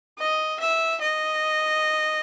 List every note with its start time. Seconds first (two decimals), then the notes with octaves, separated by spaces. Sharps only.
0.19 D#5
0.60 E5
1.01 D#5